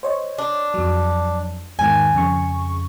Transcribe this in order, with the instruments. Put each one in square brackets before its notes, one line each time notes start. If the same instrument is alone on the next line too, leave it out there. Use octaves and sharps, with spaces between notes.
[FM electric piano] C5 C#5 D#5
[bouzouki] D4
[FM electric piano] F2 F#3
[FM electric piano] E2 G#2 D#3 [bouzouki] G#5
[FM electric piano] F2 C#3 C#6